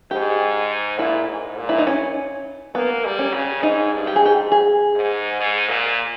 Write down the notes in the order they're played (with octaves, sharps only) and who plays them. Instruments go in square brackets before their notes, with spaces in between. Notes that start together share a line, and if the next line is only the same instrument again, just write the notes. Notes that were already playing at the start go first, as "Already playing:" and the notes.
[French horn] G#2 [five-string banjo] G4
[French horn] A#2 [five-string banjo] E4
[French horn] G#2
A#2
[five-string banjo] E4
D#4
C#4
[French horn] A#3 [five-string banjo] B3
[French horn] G3
[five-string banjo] C#4
[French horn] C#3
[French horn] G#2 [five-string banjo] D#4
[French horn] G2
[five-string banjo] G4
G#4
[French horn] G#2 [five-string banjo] G4
[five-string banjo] G#4
[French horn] G#2
G#2
A#2